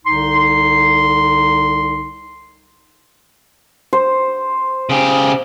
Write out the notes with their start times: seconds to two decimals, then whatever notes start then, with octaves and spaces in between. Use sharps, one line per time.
0.05 C2 D3 D#4 C6
3.93 C5
4.89 C#3 G4